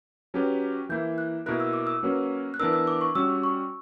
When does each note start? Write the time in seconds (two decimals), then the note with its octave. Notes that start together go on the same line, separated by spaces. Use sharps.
0.34 F#3 C#4 G4 B4
0.89 E3 A#3 E4 G6
1.18 F#6
1.46 B2 A#3 E4 A#4 F#6
1.60 E6
1.73 D6
1.87 E6
2.03 F#3 A#3 C#4 F#4 B4
2.54 F#6
2.59 E3 B3 D4 A#4 E6
2.73 E6
2.87 D6
3.01 C#6
3.15 G3 C#4 F#4 E6
3.44 C#6